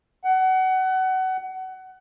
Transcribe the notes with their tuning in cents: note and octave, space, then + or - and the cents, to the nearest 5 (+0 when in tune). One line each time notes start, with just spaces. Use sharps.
F#5 +25